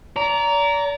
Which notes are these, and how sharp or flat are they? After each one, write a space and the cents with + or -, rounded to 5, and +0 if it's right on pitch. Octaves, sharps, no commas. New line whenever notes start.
D5 -35 A#5 +0